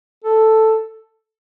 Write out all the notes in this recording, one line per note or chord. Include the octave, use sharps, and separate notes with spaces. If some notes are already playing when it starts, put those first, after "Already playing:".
A4